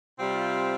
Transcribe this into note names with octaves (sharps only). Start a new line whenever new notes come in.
C3 G3 C4 F4